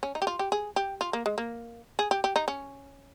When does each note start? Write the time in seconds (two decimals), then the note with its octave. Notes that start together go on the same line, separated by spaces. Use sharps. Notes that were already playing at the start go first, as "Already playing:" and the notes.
0.03 C#4
0.15 D#4
0.22 G4
0.27 F4
0.39 G4
0.52 G#4
0.76 G4
1.01 F4
1.13 A#3
1.26 G#3
1.38 A#3
1.99 G#4
2.11 G4
2.24 G4
2.36 D#4
2.48 C#4